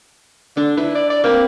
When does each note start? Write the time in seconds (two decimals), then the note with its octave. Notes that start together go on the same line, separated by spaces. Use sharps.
0.57 D3 D4
0.77 E4 B4
0.95 D5
1.10 D5
1.24 A#3 C4 B5